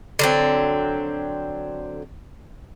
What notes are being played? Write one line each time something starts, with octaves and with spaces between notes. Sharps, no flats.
D3 F#3 C4